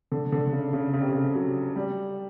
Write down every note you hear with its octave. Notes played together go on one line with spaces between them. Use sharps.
D3
D3
C#3
C#3
C#3
C3
C#3
F#3
G3